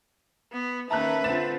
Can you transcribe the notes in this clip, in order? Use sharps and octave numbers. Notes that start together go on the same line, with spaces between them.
B3
D#3 A#3 C#4 B4 E5 A5 A#5 F#6
D3 C4 F4 A6 E7